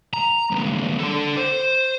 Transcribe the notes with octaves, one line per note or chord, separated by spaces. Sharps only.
A#5
C#2 G2
D4 A4
C5